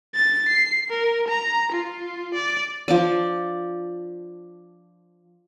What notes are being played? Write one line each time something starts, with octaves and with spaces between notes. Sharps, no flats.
A6
C7
A#4
A#5
F4
D5
F3 D4 D5